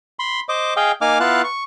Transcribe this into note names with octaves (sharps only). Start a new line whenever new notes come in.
B5 C6
C5 D#5 D6
G#4 D#5 F5 G5
A#3 D#4 G#5 D6 F6
B3 E4 F4 F5 A5 F#6
C#6